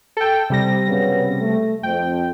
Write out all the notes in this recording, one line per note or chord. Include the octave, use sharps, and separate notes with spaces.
A4 G5
C3 G3 A#6
F#2 C#3 B3
A3
F2 G5